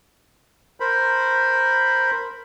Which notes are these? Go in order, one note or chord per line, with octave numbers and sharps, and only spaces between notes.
A#4 C5 B5